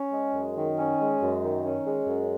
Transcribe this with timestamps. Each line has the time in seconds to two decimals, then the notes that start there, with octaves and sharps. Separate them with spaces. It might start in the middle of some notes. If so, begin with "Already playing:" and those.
Already playing: C#4
0.12 G#3
0.35 F#2
0.57 D#3
0.78 C#4
1.00 G#3
1.21 F#2
1.43 D#3
1.65 C#4
1.87 G#3
2.07 F#2